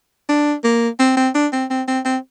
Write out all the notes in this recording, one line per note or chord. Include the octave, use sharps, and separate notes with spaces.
D4
A#3
C4
C4
D4
C4
C4
C4
C4